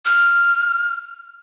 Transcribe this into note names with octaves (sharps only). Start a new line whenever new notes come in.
F6